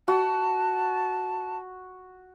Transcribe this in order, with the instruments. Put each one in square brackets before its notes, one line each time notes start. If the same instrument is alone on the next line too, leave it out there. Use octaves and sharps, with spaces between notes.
[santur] F#4 [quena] A5